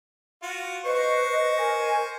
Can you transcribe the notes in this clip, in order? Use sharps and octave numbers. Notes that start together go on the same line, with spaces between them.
F4 F#4
B4 C5 D#5 C#6
A#4 G#5